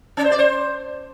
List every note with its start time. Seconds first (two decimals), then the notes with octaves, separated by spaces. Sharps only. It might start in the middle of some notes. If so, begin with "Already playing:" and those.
0.17 C#4
0.24 C5
0.31 D5
0.39 C5